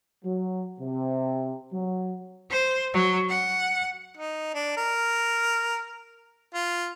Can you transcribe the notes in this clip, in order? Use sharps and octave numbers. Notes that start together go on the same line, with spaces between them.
F#3
C3
F#3
C5
F#3
F#5
D#4
D4
A#4
F4